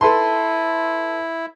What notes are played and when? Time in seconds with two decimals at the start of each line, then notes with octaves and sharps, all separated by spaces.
0.01 E4 A4 B4 A5 C6